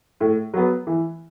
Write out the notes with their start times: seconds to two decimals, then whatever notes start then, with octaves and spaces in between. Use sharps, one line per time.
0.20 A2
0.54 F#3 B3
0.87 E3